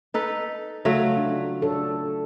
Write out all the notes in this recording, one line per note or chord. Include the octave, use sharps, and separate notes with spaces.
D#4 A4 B4
C#3 F#3 A3 F4
D4
D4 A4 C#5